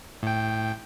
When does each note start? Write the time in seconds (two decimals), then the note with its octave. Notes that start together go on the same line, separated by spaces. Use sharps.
0.23 A2 G5